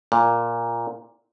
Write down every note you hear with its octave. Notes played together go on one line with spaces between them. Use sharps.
A#2